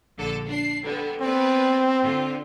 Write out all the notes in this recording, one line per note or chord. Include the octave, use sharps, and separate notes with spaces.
A#1 D3 A4
D4 C7
D3 G3 B3
B3 C4 B4 D5
D3 F4